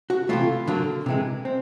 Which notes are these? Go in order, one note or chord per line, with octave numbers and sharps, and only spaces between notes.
F#4
C3 E3 A3 F4
D3 F#3 A#3
C3 E3 G#3
C4